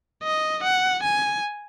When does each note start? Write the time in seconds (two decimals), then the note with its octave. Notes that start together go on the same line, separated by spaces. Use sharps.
0.23 D#5
0.63 F#5
1.03 G#5